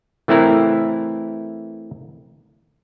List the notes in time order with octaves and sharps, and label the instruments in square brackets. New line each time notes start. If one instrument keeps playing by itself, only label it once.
[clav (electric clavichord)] E3 A3 C4 E4 A#4